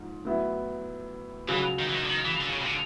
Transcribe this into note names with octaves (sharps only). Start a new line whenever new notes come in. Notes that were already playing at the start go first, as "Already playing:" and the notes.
Already playing: G#2 F3
A2 F#3 B3 E4
C#2 C#3 E3 F#3
D#3
E3
D#3
D3
D#3
E3
D3
C#3
C3
D3